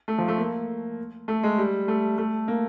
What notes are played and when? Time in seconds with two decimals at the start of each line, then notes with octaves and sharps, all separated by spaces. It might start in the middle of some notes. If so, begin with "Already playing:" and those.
0.08 A3
0.18 F3
0.28 A3
0.38 A#3
1.28 A3
1.43 G#3
1.58 G3
1.88 A3
2.18 A3
2.48 A#3